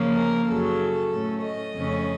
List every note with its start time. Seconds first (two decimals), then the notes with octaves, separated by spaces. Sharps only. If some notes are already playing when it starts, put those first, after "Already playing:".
Already playing: C#3 F3 A#3 C#4
0.15 A#4
0.46 F#2 C#3 F#3 A4
1.10 A2 A3 C#4
1.42 D#5
1.73 F2 C#3 A3 C#4